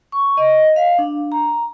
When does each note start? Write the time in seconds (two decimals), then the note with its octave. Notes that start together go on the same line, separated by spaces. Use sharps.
0.12 C#6
0.37 D#5
0.76 F5
0.99 D4
1.32 A#5